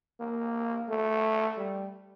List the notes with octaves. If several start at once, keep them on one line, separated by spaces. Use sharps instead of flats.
A#3
A3
G3